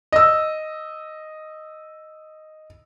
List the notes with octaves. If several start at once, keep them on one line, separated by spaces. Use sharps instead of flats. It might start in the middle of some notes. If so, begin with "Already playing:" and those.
D#5 E6